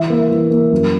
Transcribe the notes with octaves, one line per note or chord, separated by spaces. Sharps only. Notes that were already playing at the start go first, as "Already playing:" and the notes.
Already playing: E3 E5
A#3
E3
A#3
F#2